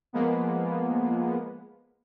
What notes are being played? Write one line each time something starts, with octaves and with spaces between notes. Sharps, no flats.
F3 G#3 A#3 B3